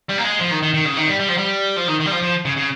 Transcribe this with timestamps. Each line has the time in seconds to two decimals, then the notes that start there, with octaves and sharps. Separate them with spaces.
0.09 G3
0.18 A#3
0.24 G#3
0.39 F3
0.51 D#3
0.62 D#3
0.74 D#3
0.85 C#3
0.97 D#3
1.07 G3
1.20 G3
1.28 F3
1.38 G3
1.76 F3
1.88 D#3
2.00 D#3
2.06 G3
2.11 F3
2.22 F3
2.45 C#3
2.57 C#3